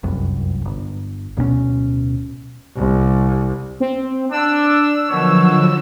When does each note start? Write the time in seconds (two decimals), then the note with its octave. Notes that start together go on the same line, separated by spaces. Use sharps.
0.03 F1 C2 F#2
0.65 G1
1.37 D1 B2 B3 C#4
2.76 C2
3.80 C4
4.32 D4 E6
5.09 B2 D3 D#3 F3 F#3 C#5